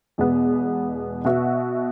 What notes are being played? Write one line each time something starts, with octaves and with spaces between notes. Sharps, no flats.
E2 B2 G#3 B3
B2 B3 F#4 E5